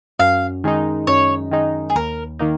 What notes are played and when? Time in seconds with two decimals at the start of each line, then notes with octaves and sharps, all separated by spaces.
0.19 F#2 F5
0.64 D#3 G#3 D#4
1.07 F#2 C#5
1.51 D#3 G#3 D#4
1.90 G#4
1.95 D#2 A#4
2.39 D#3 A#3 D#4